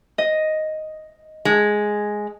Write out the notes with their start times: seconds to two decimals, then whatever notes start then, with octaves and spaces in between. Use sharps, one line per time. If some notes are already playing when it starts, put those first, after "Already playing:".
0.18 D#5
1.45 G#3